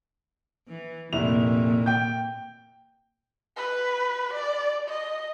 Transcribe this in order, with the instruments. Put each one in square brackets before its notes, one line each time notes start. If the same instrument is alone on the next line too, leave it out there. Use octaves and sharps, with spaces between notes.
[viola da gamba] E3
[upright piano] F1 E4 F7 [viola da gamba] A#2
[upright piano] G5 G6
[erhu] B4
D5
D#5